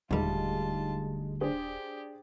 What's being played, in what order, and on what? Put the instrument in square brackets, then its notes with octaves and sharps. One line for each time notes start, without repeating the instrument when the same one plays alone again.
[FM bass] D#1 [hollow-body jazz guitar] D2 G3 [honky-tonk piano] G#3 D#4 [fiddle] F4 A5
[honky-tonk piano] D4 G#4 C5 [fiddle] G4